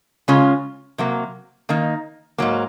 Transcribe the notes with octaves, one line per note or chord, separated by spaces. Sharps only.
C#3 G#3 C#4 F4
C3 F#3 A#3
D#3 A#3 D#4
G#2 F#3 A#3